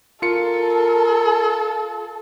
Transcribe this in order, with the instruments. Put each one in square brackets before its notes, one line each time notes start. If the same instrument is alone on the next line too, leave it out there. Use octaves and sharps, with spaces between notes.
[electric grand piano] F4 C#7 [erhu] A4 [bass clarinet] A#4